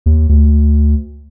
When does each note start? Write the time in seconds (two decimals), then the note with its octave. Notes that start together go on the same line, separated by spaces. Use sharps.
0.06 D#2
0.29 D2